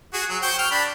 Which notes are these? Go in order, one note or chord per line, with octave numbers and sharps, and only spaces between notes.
F#4 G#4
F#3
C5 G5 C#6
G5 F6
D4 B5